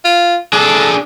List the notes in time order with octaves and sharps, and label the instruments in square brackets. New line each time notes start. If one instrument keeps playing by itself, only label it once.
[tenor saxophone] F4
[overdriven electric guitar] D4 G#4 [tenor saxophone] A4